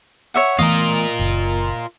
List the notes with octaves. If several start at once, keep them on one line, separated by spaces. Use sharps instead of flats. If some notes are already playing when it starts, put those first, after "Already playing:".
C#5 E5 F#5
E3 A3 B3 F4 A#4 D#5
F#1